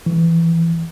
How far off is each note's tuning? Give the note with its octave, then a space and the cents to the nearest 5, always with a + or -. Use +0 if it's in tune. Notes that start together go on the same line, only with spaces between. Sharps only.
E3 +15